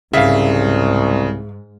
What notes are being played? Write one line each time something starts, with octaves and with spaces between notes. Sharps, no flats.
C2 G#2 C#3 E5 F5